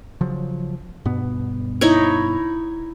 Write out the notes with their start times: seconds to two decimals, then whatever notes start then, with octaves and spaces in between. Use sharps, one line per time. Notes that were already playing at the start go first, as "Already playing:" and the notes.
0.21 C#3 F3 F#3
1.05 G2 B2 B3
1.81 D#4 E4 C#5